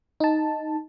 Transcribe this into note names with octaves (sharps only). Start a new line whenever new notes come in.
D#4 A5